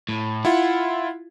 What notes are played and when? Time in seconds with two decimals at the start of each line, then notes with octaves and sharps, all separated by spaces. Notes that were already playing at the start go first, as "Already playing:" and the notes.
0.09 A2
0.45 E4 F4 F#5